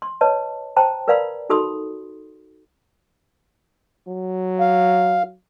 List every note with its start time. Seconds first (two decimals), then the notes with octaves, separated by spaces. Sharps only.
0.02 C6
0.21 B4 C#5 D#5 A5
0.76 C5 G5 A5 A#5
1.08 A#4 B4 D5 F5 A#5 B5
1.50 D#4 F#4 A4 B5 C6 D#6
4.08 F#3
4.60 F5